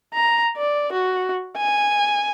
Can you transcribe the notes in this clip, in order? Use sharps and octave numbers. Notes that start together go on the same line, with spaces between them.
A#5
D5
F#4
G#5